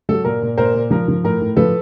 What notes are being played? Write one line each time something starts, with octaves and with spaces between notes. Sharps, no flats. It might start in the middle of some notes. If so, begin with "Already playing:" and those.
F#3 A4
A#2 A#4
A#2
A#2 A#4 C5
A#2
F3 A#4
F3
A2 A#4
A2
F3 A4 B4